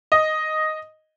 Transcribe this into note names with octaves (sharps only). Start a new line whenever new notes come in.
D#5